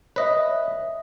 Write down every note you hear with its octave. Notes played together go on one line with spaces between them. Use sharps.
B4 C#5 D#5 E5